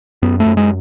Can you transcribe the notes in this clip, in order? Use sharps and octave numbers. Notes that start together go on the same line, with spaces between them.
F#2 B3
A3
F#2
G#3